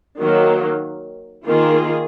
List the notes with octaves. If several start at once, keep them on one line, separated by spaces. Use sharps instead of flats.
D#3 F#3 A#3
D#3 A#3 F4 G#4